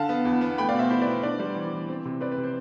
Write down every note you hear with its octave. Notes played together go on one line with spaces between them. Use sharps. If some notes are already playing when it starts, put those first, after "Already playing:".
Already playing: D3 F5 A5
B3
E2
B3
A3 G5 B5
D5 F5
B2
C5 E5
E4 C5
B4 D5
B2
D4 B4 D5
G3 C5
E3
E3
C4
C3
C4 B4 D5
B4
C3
C5